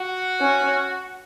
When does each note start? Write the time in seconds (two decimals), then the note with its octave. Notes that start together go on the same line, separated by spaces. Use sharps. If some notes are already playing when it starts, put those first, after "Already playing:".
Already playing: F#4
0.41 C#4